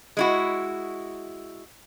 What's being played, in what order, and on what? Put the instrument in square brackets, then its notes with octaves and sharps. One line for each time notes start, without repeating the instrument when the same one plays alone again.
[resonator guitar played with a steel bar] G#3 E4 F#4